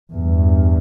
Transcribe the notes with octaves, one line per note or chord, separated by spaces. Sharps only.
E2 G2